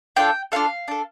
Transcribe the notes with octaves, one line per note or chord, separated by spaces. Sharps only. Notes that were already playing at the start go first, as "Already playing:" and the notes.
D4 F4 A4 G5
D4 F4 A4 F5
D4 A4